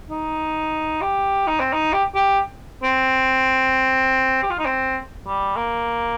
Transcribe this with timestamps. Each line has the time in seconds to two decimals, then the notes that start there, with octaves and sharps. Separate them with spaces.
0.10 D#4
1.01 G4
1.47 D#4
1.60 C4
1.73 D#4
1.92 G4
2.15 G4
2.83 C4
4.43 G4
4.50 F4
4.59 D#4
4.66 C4
5.27 G3
5.57 A#3